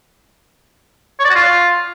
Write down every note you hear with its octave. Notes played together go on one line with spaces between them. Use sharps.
C#5
D5
F#4
F4